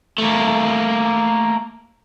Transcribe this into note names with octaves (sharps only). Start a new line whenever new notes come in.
A3 A#3